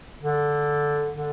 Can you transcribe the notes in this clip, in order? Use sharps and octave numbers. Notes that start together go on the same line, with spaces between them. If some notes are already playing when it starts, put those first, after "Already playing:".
D3
D3